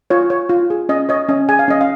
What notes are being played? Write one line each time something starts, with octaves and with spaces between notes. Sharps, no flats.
F4 C#5
C#5
F4
G#4
C#4 D#5
C#5 D#5
C#4 D#5
G#4 G#5
F5
C#4 D#5
F5